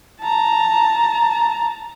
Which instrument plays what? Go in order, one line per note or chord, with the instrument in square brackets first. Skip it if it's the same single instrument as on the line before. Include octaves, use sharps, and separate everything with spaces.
[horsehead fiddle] A5 A#5